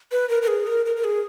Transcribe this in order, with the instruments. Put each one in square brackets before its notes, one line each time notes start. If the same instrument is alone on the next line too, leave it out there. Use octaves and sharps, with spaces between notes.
[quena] B4
A#4
A#4
G#4
A#4
A#4
A#4
G#4